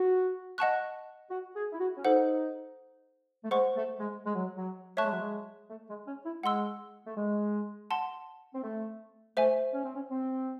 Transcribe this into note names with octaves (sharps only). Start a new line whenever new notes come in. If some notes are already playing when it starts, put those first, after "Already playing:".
Already playing: F#4
D#5 F#5 A5 C#6 F#6
F#4
G#4
E4
F#4
C#4
D#4 A4 C5 F#5
A3
G#3 C5 F#5 C#6
A3
G#3
G#3
F#3
F#3
A3 C#5 E5 A5 C#6 F#6
G#3
F#3
G#3
A3
G#3
C#4
E4
G#3 F#5 C6 E6
A3
G#3
F#5 A5 C6
C4
A3
A3 C5 E5 G#5
C#4
C4
C#4
C4